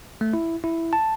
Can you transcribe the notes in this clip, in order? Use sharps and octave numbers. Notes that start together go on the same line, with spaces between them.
A3
E4
E4
A5